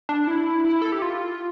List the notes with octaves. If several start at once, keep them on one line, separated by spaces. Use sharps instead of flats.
D4
E4
E4
A4
G4
F4